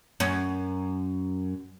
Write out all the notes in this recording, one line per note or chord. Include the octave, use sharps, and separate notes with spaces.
F#2 C#4